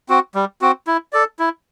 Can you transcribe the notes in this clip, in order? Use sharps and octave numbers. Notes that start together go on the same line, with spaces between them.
C4 F#4
G3
C4 F#4
E4
A4 D5
E4